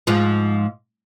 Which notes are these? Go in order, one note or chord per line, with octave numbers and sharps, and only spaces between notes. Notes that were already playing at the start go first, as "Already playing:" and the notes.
G#2 F3